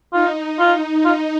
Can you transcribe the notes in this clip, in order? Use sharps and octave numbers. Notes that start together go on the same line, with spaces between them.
D#4 F4
F4
D#4 F4